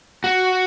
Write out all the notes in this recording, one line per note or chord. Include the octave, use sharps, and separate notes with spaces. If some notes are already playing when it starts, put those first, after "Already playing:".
F#4